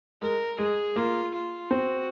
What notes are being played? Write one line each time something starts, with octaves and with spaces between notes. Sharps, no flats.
G#3 A#4
G#3 G#4
A#3 F4
F4
C4 F#4